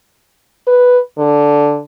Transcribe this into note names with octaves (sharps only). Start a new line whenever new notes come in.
B4
D3